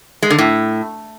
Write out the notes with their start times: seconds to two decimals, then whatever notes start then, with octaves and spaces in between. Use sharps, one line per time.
0.22 G#3
0.30 D3
0.38 A2